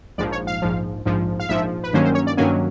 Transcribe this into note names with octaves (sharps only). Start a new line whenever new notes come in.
A#1 G#2 F3 D5
C#5
F5
A#1 G#2 F3
A#1 G#2 F3
F5
A#1 G#2 F3 E5
B4
G2 D#3 F#3 A#3 C#4 C5
C5
C#5
D5
G2 D#3 F#3 A#3 C#4 G#5